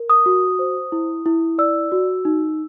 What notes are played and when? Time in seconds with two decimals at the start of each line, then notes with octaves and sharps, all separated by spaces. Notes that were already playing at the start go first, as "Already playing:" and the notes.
Already playing: A#4
0.10 D#6
0.26 F#4
0.59 C5
0.92 E4
1.26 E4
1.58 D5 E6
1.92 F#4
2.25 D#4